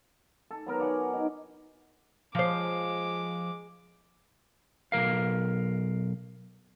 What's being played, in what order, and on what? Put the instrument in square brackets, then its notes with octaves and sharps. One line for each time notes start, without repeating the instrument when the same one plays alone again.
[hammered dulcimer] A4
F#3 B3 A#4
C#5 D5 F#5 G#5
D#4
[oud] F3 C5 [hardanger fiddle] G#3 D6
[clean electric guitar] B1 D#3 A#4 F5